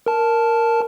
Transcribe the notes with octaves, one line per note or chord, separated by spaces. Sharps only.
A#4 A5